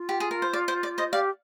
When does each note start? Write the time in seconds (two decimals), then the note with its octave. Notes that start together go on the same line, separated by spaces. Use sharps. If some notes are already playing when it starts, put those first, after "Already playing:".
Already playing: F4
0.09 G4
0.20 G#4
0.31 A#4
0.42 C5
0.53 D5
0.68 C5
0.83 D5
0.98 C5 D#5
1.12 G4 D5 F5